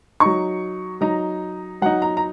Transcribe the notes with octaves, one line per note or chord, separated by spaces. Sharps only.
F#3 D#4 C#6
F#3 D#4 A#5
F#3 D#4 F#5
A#5
A#5